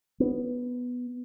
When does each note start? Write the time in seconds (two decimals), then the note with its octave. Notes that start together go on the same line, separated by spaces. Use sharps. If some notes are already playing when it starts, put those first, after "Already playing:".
0.20 B3